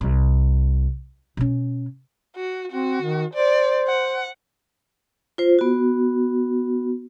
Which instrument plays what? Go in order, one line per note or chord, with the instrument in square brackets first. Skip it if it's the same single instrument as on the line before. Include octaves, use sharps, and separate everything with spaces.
[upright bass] C2
B2 C#4
[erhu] F#4
[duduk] C4 [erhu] F#4
[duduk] D#3
[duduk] C5 [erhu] D5
[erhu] F#5
[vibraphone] F4 C5
B3 F#4